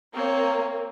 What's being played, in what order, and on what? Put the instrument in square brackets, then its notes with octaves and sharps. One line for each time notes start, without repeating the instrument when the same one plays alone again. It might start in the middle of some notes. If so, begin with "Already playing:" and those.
[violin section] A#3 [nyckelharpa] C4 C#5